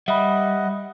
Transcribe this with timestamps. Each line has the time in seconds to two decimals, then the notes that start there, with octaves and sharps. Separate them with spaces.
0.08 G3 D#5 E5 F#5 B5